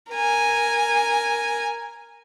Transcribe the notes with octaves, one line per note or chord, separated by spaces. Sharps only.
A#4 G#5